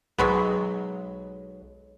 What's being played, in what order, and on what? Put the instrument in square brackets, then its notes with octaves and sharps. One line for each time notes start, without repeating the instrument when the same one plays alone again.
[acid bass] B1 [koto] F#3 G#3 B3